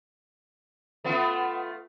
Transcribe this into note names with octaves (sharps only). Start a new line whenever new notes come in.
A3 B3 F4